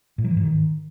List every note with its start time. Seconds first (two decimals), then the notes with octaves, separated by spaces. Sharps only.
0.18 A2
0.24 F#3
0.31 E3
0.37 G#2
0.43 D#3